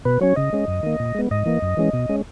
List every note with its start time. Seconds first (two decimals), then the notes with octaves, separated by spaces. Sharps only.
0.05 B2 B4
0.21 F#3 C#4 C#5
0.36 C#3 D#5
0.53 G#3 C#4
0.68 F#2
0.83 D#3 A#3
1.00 A#2
1.15 G#3 B3
1.31 G#2 D#5
1.46 E3 A#3
1.62 F#2
1.77 E3 G#3 C#4
1.93 B2
2.09 G#3 C#4